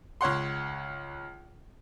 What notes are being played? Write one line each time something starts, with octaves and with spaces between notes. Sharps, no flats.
C#2 C#5 F#5 C6